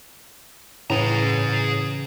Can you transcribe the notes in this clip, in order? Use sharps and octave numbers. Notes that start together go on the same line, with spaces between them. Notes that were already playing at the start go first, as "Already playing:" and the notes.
A2 C#3 E3 C#4 G#4 A#5